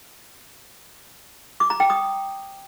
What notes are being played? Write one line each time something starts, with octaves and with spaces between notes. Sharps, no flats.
D6
A#5
G5
D#6